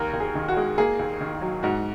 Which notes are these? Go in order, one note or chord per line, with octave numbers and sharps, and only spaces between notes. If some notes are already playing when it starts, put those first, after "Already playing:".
Already playing: D#2 A#4
D#2
G#4
D#3
F#4
G#3
A#3 G#4
D#2
D#3
F#3
G#2 F#4